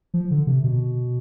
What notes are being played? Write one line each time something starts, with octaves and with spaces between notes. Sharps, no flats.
F3
D3
C3
B2